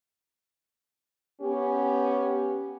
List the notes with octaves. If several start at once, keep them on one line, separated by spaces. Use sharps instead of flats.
B3 C#4 G4